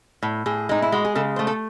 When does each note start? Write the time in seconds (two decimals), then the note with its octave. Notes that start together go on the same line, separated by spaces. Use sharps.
0.23 A2
0.46 A2 G#4
0.69 G#3 D#4
0.82 E4
0.92 G#3 F#4
1.05 G#4
1.15 C#3 A4
1.36 A3 C5
1.47 A4